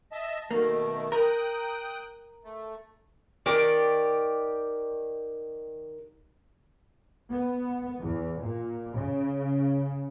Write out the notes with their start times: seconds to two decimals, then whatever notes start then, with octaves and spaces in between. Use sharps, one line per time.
0.12 D#5 E5 A5
0.51 B2 D#3 A3 A#3
1.12 A#4 G5 D#6 F#6
2.45 A3
3.46 D#3 G4 D5
7.31 B3
8.00 E2
8.40 A#2
8.96 C#3